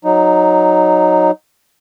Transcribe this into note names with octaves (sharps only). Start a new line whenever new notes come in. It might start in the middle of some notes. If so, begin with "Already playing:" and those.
F#3 D#4